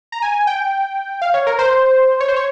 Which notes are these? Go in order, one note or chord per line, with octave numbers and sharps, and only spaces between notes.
A#5
G#5
G5
F5
C#5
A#4
C5
C#5
C5
C#5